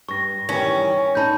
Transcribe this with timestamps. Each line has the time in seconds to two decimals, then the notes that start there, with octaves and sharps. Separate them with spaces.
0.09 G2 C#6 A#6
0.49 D#3 E3 G3 C#4
1.15 D4 D#4 A5 B5 G6